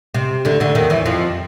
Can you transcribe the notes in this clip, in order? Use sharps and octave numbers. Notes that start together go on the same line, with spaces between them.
C3
D2 D3
D2 D3
D#2 D#3
E2 E3
F2 F3